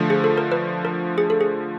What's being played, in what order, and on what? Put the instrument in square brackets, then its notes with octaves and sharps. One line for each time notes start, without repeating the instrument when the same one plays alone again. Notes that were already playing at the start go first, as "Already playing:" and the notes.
Already playing: [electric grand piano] D3 F3 A3
[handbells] G#4
A4
A#4
B4
A#4
G#4
A4
G#4